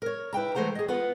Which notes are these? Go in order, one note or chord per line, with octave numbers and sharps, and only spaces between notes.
A#4 C#5
E4 B4 G5 A#5
E3 G#3 A3 C5 F#5 A#5
G#4 D#5
B3 F4 B4 F#5